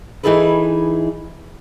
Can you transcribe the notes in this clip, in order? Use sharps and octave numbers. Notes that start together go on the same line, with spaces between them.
E3 D#4 E4 G#4 A4 B4